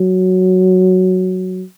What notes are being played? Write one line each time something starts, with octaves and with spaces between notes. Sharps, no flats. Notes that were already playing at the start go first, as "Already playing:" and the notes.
Already playing: F#3